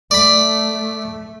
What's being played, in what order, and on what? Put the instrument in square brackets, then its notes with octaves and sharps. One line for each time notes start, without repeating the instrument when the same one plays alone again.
[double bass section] A3 [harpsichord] D5 B5